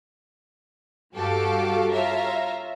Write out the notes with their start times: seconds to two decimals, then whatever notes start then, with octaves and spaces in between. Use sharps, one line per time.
1.16 G2 F#4 G4 A4 F5 D6
1.92 F4 C#5 E5 F5 A#5